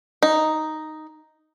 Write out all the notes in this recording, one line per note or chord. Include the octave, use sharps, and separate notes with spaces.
D#4